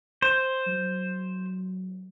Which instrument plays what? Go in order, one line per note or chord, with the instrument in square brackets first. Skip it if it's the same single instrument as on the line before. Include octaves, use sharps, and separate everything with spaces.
[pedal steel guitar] C5
[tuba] F#3